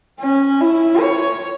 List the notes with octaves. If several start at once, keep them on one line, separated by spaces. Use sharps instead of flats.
C#4
E4
C#5